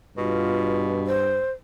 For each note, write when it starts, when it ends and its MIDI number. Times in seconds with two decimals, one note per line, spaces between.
0.17 1.45 43
0.17 1.11 47
0.17 0.84 65
1.07 1.51 72